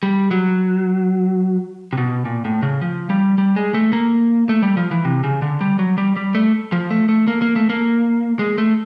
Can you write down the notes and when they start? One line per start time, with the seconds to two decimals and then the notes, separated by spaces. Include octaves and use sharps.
0.03 G3
0.31 F#3
1.93 C3
1.98 B2
2.25 A#2
2.45 A2
2.63 C#3
2.81 F3
3.10 G3
3.38 G3
3.56 G#3
3.74 A3
3.93 A#3
4.49 A3
4.62 G3
4.77 F3
4.91 E3
5.05 C3
5.24 C#3
5.42 D3
5.61 G3
5.79 F#3
5.98 G3
6.16 G3
6.35 A3
6.72 F3
6.91 A3
7.09 A3
7.28 A#3
7.42 A#3
7.56 A3
7.70 A#3
8.39 G#3
8.58 A3